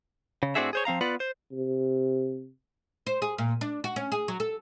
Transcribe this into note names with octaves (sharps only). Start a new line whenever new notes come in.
C#3
A2 C4 D4 F#4 G#4 E5
G#4 C5 C#5
F3 C4 F5 A#5
B3 F4 B4 D5 F#5
C5
C3
C5
G#4
A#2
D4
F#4
C#4
G#4
F#3
A4